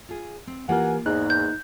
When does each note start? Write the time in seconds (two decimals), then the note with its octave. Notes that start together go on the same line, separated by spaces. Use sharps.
0.09 F4 G#4
0.47 C4
0.69 E3 A#3 F4 G4 A#4 F#5 G#5
1.06 E2 G#2 D#4 F#6
1.30 G6